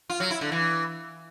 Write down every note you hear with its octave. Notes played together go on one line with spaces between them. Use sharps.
F4
F#3
E4
D3
E3